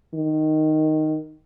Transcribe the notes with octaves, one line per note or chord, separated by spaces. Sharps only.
D#3